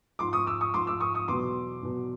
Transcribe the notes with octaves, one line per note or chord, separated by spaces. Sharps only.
G#2 F3 C6 D6
C#6 D#6
D6 E6
C#6 D#6
G#2 F3 C6 D6
D6 E6
C#6 D#6
C#6 D#6
E2 B2 F#3 C6 D6
E2 B2 F#3